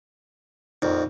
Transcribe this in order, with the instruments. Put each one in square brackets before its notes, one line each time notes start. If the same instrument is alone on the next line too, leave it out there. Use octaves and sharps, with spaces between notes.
[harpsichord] A#1 F2 [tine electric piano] D#4